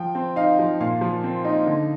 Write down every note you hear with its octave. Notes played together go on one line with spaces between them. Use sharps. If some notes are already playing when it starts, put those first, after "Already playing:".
Already playing: F3 G5
C4
D#4 F5
F3
A#2 F5
F3
C4
D#4
D3